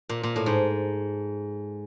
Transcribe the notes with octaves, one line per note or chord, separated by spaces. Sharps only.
A#2
A#2
A2
G#2